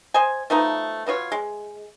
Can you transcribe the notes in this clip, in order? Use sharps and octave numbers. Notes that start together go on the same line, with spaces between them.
C5 D#5 G#5
F3 A3 B3 D#4
B2 B3 F4 C#5
G#3